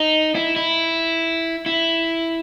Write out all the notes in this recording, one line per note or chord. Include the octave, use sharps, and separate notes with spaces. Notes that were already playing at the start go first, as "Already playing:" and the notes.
Already playing: D#4
E4
E4
E4